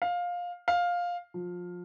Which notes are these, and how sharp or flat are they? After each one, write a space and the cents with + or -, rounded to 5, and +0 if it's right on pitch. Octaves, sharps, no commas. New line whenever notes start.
F5 +15
F5 +10
F3 +25